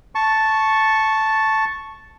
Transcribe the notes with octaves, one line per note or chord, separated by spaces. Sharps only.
A5 C#6